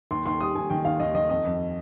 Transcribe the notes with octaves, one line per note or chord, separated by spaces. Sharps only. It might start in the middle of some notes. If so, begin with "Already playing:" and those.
D#2 C6
D#2 C6
G3 D#6
D#2 G#5
D#3 G5
D#2 F5
D#2 D#5
D#3 D#5
F2 D#5
F2